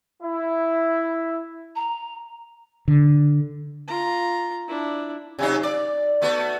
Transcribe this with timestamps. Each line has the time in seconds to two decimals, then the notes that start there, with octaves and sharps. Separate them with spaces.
0.22 E4
1.76 A#5
2.88 D3
3.87 F4 A#5
4.68 D4 E4
5.39 C3 F#3 D#4
5.63 D5
6.22 A3 B3 F#4